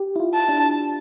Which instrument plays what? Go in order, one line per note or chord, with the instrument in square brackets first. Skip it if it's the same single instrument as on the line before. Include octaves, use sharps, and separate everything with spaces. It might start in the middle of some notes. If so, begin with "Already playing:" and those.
Already playing: [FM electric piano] G4
E4
F4
[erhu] A5
[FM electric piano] D4